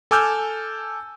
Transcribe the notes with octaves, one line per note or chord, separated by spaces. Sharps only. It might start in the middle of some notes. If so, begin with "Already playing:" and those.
A4 G#5 D6 E6 F6 G6